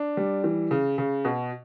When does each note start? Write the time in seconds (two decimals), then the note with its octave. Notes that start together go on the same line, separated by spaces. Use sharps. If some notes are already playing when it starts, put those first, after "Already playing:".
Already playing: D4
0.17 G3
0.44 E3
0.71 C#3
0.98 C#3
1.25 B2